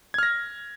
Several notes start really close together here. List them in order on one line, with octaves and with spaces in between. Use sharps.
G#6 F6 A#6